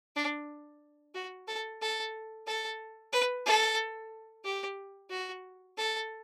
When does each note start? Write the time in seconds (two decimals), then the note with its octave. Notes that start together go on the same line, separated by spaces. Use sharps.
0.16 D4
1.15 F#4
1.47 A4
1.81 A4
2.47 A4
3.13 B4
3.46 A4
4.44 G4
5.10 F#4
5.77 A4